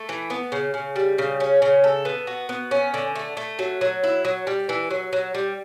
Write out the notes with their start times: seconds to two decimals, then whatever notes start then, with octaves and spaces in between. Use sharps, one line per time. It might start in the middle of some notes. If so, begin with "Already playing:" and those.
Already playing: A3
0.09 E3
0.30 B3
0.52 C#3
0.74 C#3
0.96 G3
1.18 C#3
1.40 C#4
1.62 C#3
1.84 A4
2.05 B3
2.27 F#4
2.49 B3
2.71 C#4
2.94 D3
3.15 A3
3.37 A3
3.59 F#3
3.81 F#3
4.03 E4
4.25 F#3
4.47 G3
4.69 E3
4.91 F#3
5.13 F#3
5.35 G3